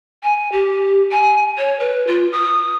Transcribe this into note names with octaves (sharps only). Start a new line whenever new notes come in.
G#5
G4
G#5
C#5
B4
F4
D#6